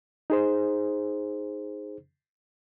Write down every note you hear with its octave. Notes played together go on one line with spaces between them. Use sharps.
D#4 G#4 C5